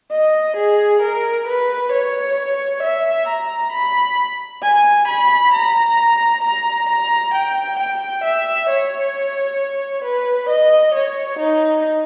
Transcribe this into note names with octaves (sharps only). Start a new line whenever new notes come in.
D#5
G#4
A#4
B4
C#5
E5
A#5
B5
G#5
B5
A#5
A#5
A#5
G5
G5
E5
C#5
B4
D#5
C#5
D#4